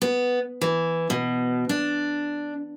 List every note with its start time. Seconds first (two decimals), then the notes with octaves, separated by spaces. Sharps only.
0.02 B3
0.61 E3
1.10 B2
1.69 D4